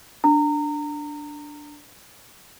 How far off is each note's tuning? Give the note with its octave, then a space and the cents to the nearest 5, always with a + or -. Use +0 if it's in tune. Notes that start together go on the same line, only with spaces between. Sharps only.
D4 +0 A#5 -25